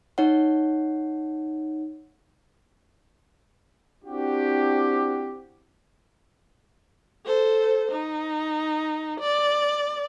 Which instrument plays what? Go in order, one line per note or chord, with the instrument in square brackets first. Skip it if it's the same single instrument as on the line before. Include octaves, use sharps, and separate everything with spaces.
[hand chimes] D#4 C#5 F#5
[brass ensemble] C4 D4 E4 F#4 G4
[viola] A4 C5
D#4
D5